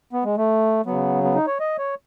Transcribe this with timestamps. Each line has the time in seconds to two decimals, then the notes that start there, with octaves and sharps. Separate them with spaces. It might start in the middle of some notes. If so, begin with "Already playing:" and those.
0.13 B3
0.25 G#3
0.37 A3
0.86 C#3 F#3 B3
1.24 B3
1.35 D#4
1.47 C#5
1.60 D#5
1.78 C#5